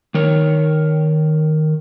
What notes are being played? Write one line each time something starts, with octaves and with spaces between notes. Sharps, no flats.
D#3 A#4 C#5